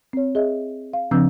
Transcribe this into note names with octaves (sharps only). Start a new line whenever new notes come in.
C4 C#5
G#4 D#5 E5
F5
C#3 F3 C4 D4 E6 G6